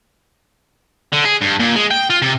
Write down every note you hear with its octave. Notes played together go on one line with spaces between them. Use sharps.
D3
G#4
G2
A#2
G#3
G5
F4
C3